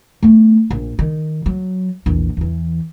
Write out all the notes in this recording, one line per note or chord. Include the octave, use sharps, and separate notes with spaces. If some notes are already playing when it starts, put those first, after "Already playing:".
A3 B3
A#1
D#3
F#3
A#1 E2
E2 E3